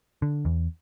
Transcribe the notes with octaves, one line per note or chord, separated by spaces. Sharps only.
D3
E2